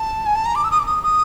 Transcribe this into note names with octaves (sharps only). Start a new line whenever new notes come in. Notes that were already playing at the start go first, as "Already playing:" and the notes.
Already playing: A5
G#5
A5
A#5
D6
E6
D#6
D6
D#6
D#6